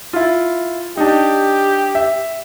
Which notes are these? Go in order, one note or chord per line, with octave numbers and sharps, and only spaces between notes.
E4 F4
D4 D#4 G4
E5